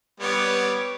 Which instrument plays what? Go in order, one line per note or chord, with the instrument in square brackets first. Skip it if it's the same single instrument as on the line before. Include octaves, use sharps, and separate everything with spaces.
[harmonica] G3 B3 [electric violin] C#5 D6